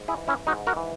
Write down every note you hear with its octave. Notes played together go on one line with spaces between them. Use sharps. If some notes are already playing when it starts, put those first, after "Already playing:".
Already playing: G#2
E4 G#4
E3
C#4 E4
G#2 D#4 F#4
F#4 A#4
E3